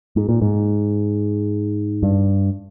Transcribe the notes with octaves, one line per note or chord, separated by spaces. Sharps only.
G#2
A#2
G#2
G2